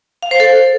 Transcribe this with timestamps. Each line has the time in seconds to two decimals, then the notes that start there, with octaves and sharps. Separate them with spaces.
0.23 F5
0.31 C5
0.40 A4